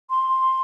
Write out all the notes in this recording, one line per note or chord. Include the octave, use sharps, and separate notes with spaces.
C6